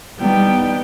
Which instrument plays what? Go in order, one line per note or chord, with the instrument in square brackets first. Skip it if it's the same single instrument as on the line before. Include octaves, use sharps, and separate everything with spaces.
[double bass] G3 D#4 [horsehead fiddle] B3 G5